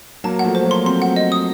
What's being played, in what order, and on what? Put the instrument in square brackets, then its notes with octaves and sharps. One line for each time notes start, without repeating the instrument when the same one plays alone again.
[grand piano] F#3 A#3 [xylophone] A5
[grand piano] F3 A3 [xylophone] F#5
[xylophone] C5
[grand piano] F#3 A#3
[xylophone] C6
[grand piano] A3 C4 [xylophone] C6
[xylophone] F#5
D#5
D#6